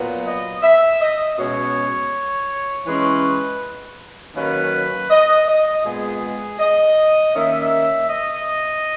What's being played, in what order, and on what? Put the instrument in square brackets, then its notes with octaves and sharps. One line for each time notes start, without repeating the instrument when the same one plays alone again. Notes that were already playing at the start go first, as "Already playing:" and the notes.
Already playing: [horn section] A#2 F#3 B3
D#5
E5
D#5
B2 G#3 C#4 C#5
E3 G#3 C#4 B4
D#3 F#3 A#3 C#4 B4
D#5
D#5
A#2 G#3 B3 G#4
D#5
D#3 A#3 C#4 E5
D#5